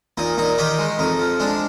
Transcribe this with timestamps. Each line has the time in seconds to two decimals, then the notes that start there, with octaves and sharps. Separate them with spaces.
0.18 A#2 D#4
0.38 A#2 D#4
0.58 D#3 D#4 G4
0.79 G#3
0.99 F2 D#4
1.19 F3
1.40 G#3 D4